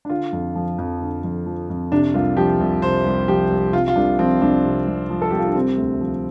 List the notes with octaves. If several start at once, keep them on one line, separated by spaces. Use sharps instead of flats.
D4
D3 F4
F2
F3
F2
D3
F2
F3
F2
C3 D4
C2 F4
F3 G4
C2
C3 C5
C2
F3 G4
C2
C3 F4
F4
C2 D4
F3 C4
C2 D4
C3
C2
F3
A4
C2 G4
F4
D4
C3 C4
D2
F3